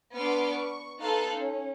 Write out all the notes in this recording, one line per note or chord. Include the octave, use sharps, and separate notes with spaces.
B3 D4 B4 C6 D6 F6
C#6
B3 D#4 A4 F5 C6 F#6
C#4